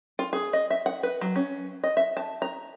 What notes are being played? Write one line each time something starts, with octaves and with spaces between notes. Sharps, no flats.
F4
G#4
D#5
E5
F#5
B4
F#3
C#4
D#5
E5
A5
A#5